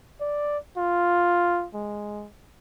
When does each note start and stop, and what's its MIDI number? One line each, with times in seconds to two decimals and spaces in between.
0.21 0.58 74
0.77 1.67 65
1.74 2.27 56